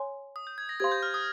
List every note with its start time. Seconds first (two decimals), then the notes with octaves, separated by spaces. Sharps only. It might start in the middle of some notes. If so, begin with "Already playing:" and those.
Already playing: C#5 G#5 C6
0.36 D#6
0.47 G6
0.58 G#6
0.69 A#6
0.80 G4 C5 F5 C6 G#6
0.92 G6
1.03 F6
1.14 D#6